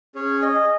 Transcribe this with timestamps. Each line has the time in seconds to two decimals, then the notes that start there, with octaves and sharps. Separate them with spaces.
0.15 C#4 G#4 C#5
0.42 D#5